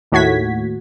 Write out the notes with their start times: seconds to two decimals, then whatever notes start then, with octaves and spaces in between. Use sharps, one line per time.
0.12 D#2 A2 F#4 G#6 B6